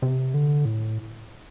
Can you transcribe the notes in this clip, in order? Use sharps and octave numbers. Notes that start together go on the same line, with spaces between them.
C3
D3
A2